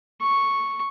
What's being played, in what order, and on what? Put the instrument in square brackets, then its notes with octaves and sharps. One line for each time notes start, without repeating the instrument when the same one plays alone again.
[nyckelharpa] C#6